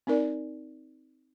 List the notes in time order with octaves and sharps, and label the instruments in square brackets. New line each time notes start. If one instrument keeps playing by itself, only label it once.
[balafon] C4 D#4 A#4 D5